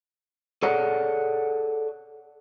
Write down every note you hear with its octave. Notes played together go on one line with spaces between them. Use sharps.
G#4 A4 C#5 D5 F#5